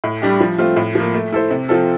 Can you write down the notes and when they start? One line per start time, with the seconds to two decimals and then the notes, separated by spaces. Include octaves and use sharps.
0.04 A2
0.22 G3 D4 G4
0.40 F3
0.58 A3 C4 F4
0.76 A2
0.95 F3 A#3
1.14 A3
1.32 E4 A4 C5
1.50 C3
1.69 F3 C4 F4 A4